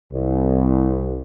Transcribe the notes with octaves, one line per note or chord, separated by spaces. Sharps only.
C2